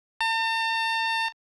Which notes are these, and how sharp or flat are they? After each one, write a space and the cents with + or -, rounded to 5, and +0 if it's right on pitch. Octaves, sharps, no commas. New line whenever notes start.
A5 +45